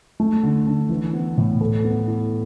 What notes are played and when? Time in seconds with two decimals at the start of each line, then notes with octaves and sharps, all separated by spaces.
0.20 A3
0.43 D3
0.67 D3
0.89 E3
1.13 B3
1.37 A2
1.61 A4
1.84 B3
2.07 E4